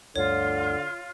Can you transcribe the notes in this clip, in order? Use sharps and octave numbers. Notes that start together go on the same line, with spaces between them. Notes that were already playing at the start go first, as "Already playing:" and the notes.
D2 G2 D3 A3 F4 C#5